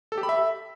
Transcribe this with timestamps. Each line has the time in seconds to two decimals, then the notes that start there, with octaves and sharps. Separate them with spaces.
0.12 A4
0.18 G4
0.23 B5
0.29 E5